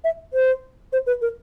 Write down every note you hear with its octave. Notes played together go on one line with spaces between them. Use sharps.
E5
C5
C5
B4
A#4